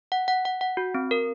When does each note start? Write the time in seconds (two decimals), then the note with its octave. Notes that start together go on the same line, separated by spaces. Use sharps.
0.12 F#5
0.28 F#5
0.45 F#5
0.61 F#5
0.77 F#4
0.95 C4
1.11 A#4